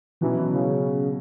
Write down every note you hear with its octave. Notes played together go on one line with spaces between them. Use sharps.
B2 E3 F#3 C#4
C#3